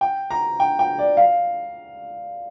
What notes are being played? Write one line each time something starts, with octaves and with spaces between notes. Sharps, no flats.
G5
A#5
G5
G5
D5
F5